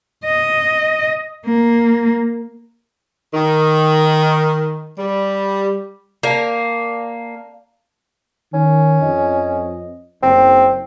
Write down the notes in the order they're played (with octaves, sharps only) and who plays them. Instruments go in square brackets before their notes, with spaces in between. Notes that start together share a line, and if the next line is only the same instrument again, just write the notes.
[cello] D#5
A#3
[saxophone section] D#3
G3
[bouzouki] A#3 [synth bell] D5 F5 A5
[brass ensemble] D#3 [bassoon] C#4
[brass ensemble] F2 D#5
[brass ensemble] F#1 [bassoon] C4